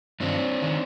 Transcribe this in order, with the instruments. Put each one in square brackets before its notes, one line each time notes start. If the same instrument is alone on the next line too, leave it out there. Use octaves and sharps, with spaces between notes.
[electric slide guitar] G2 D#3 C4 D4
D#3